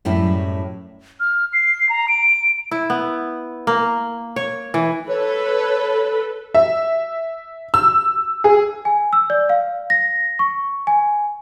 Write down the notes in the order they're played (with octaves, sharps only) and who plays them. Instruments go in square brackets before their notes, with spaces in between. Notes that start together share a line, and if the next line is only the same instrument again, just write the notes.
[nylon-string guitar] F#2 A2 G3 E4
[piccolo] F6
C7
A#5
D7
[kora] E4
B3
A#3
C#5
E3
[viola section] A4 B4 [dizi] C#5
[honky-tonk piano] E5
E6
G#4
[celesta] G#5
E6
D5
F5
A#6
C#6
G#5